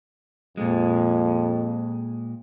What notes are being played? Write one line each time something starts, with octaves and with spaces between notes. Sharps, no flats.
F2 A#2 G#3